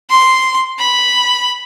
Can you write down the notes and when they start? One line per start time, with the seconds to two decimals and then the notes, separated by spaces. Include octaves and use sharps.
0.10 C6
0.79 B5